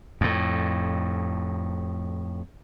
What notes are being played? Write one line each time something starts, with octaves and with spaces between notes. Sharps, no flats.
F2 A2